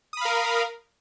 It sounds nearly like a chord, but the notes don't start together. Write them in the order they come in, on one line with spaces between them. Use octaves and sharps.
D#6 B5 F5 A#4